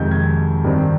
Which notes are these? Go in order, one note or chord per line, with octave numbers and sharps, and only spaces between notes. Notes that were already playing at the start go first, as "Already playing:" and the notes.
Already playing: F2 C3 D#3 G#3 G6
G#6
G2 D#3 G3 C4